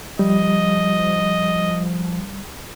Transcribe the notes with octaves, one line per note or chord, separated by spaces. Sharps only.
F3 G3 D#5